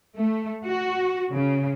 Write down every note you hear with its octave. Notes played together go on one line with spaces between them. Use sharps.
A3
F#4
C#3